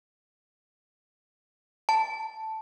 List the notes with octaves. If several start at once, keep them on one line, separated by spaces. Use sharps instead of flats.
A5